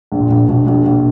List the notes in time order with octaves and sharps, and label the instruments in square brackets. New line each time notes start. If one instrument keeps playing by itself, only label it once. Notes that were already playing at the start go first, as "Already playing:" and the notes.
[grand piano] A#1
[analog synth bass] A#2
[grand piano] A#1
[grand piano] A#1 [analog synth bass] B2
[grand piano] A#1
A#1